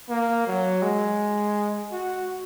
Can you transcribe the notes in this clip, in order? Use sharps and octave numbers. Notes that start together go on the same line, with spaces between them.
A#3
F#3
G#3
F#4